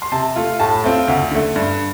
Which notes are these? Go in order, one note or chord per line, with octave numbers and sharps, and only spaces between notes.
C6
C3 A5
A3 F4
A2 A5
A3 C4 F4
D2
D3 A3
G2